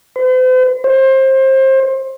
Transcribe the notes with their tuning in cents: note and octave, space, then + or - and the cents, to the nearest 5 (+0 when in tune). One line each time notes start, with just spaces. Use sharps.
C5 -45
C5 +25